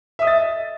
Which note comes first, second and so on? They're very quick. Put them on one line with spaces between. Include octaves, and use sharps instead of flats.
E5 D#6 D#5 A6